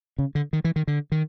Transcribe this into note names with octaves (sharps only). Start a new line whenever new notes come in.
C#3
D3
D#3
E3
D#3
D3
D#3